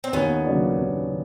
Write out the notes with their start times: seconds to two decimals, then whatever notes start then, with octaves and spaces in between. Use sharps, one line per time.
0.04 C4
0.13 D#2 B3 C#4
0.45 C#3 F#3 A#3 D4
0.77 D#2
1.09 C#3